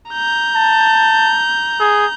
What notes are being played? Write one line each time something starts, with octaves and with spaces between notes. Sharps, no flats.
A#5 G6
A5
G#4